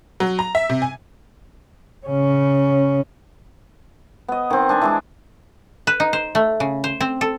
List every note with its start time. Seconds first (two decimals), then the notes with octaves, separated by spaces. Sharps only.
0.20 F#3
0.39 A#5
0.55 E5
0.70 C3
0.82 G#5
2.07 C#3 C#4
4.28 B3 D#5
4.50 D#3 C4
4.69 D4 G#5 A5 B5
4.82 E3 G#3 D4
5.87 B4
6.00 D#4
6.13 C5
6.35 A3
6.60 C#3
6.84 C5
7.01 C4
7.21 A4